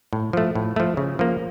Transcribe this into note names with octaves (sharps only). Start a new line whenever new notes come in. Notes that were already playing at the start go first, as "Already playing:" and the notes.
A2
F3 A3
A2
F3 A3
C#3
F3 A#3